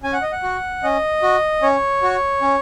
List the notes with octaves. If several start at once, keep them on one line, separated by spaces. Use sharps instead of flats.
C#4 G#5
F#5
D#5
F#5
F#4
C#4 D#5
F#4
C#4 C#5
F#4
C#4